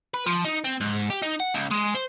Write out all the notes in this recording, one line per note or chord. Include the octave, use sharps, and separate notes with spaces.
B4
F3
D#4
C4
G#2
G4
D#4
F#5
C#2
G#3
C5